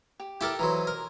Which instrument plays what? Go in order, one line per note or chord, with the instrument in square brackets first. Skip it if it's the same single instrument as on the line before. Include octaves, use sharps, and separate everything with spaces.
[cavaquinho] G4
[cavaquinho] E4 G5 D6 [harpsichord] G4 A4 A#4
[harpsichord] E3 F#3 [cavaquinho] C5 D#5 A#5
[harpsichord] A#4